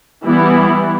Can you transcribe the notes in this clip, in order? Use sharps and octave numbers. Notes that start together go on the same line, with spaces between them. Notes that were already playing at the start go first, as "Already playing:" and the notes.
E3 G3 B3 E4